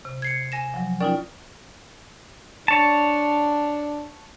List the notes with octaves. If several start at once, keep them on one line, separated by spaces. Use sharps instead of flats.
C3
G#6 C7 C#7
G#5 A#6 E7
F3 F#3
C#4 D#4 F4 A#4 D5 G5
D4 C#5 A5